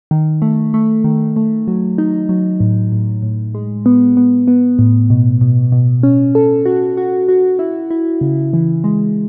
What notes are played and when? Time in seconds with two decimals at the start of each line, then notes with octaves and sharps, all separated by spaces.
0.11 D#3
0.42 A3
0.74 A3
1.04 D#3
1.36 A3
1.68 F#3
1.98 D#4
2.29 F#3
2.60 A2
2.92 A2
3.22 A2
3.55 G#3
3.86 B3
4.17 B3
4.48 B3
4.79 A2
5.10 B2
5.41 B2
5.72 B2
6.03 C#4
6.35 A4
6.66 F#4
6.97 F#4
7.29 F#4
7.59 E4
7.91 E4
8.21 C#3
8.53 E3
8.84 G#3